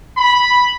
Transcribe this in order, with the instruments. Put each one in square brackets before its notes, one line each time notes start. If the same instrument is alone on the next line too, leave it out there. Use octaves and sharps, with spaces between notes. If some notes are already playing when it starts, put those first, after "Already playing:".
[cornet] B5